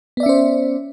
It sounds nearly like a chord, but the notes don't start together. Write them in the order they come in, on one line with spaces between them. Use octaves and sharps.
B3 D5 E5 C#4 C5